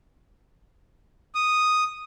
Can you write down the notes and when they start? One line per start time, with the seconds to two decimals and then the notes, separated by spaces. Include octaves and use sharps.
1.35 D#6